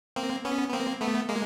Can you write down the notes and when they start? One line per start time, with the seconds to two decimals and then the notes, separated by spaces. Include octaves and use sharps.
0.16 A#3 C4
0.45 B3 C#4
0.69 B3
0.73 A#3 C4
1.01 A3 B3
1.29 G#3 A#3